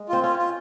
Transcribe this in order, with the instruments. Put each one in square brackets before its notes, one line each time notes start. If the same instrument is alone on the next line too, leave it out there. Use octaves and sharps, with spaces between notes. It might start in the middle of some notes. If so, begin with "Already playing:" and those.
Already playing: [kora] G#3
[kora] C4 [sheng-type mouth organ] F4
[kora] C#4 [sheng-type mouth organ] F4
[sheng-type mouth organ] F4